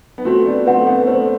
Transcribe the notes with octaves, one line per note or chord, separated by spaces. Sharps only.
B3
A3 C4 F#4
B3 D4
A3 C4 B4 F#5
B3
A3 C5